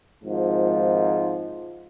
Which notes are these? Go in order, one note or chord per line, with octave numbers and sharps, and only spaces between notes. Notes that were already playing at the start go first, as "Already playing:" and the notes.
G#1 G#2 F3